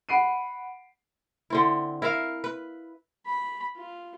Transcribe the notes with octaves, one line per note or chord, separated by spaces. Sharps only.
F#5 B5 C7 D7 D#7
D3 C4 E4
E4 A#4 E5 F5
B4
B5
F4